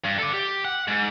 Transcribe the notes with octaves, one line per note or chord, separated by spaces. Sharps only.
G2
A4 D5
G4
F#5
G#2